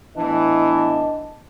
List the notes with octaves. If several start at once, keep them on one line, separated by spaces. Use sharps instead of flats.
A2 E3 B3 D4 D#5